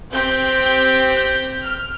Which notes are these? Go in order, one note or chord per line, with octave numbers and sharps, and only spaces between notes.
C4 G4 G6
G6
G6
F6